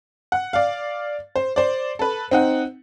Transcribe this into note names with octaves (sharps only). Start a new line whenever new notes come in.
F#5
D5 F5
C5
C5 D5
A4 B4
C4 D#4 F#5